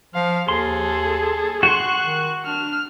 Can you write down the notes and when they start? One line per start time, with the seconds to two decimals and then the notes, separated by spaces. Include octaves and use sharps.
0.14 F3 F5
0.48 D#2 G#4 A4 C6
1.63 F#4 F#5 C6 C#6 F#6
2.00 D#3
2.46 D4 F6